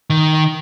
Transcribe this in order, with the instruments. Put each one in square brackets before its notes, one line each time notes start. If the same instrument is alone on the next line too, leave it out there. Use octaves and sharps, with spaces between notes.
[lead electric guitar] D#3